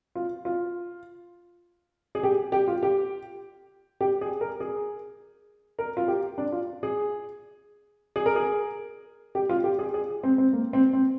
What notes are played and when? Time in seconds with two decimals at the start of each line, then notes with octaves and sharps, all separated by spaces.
0.15 F4
0.45 F4
2.15 G#4
2.23 G4
2.52 G4
2.68 F4
2.83 G4
4.01 G4
4.21 G#4
4.41 A#4
4.60 G#4
5.79 A#4
5.97 F4
6.08 G4
6.38 D4
6.52 F4
6.83 G#4
8.16 G#4
8.26 A#4
8.36 G#4
9.35 G4
9.49 F4
9.64 G4
9.79 G#4
9.94 G#4
10.23 C4
10.38 C4
10.53 A#3
10.73 C4
10.93 C4